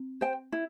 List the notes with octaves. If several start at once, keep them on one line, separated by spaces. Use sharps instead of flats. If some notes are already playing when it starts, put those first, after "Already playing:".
Already playing: C4
C5 G5
E4